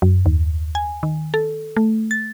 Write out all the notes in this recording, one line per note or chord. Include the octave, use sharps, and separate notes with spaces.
F#2
D#2
G#5
D#3
A4
A3
A6